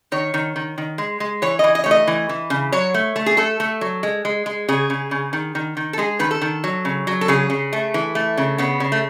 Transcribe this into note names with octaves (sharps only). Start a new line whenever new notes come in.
D#3 C#5
D#3
D#3
D#3
G#3
G#3
E3 C#5
E3 D#5
D#5
A3 C#5
D#5
E3
E3
C#3
F#3 C#5
A3
A3
G#4
A3 A4
A3
F#3
G#3
G#3
G#3
C#3 G#4
C#3
C#3
D#3
D#3
D#3
A4
G#3 G#4
D#3 B4
A4
D#3
F#3
C#3
F#3
A4
C#3 G#4
C#3
A3
E3
A3
C#3
C#3 B3
C#3
A3